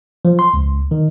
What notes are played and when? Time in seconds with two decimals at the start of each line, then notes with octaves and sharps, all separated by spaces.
0.25 F3
0.39 C6
0.54 C#2
0.91 D#3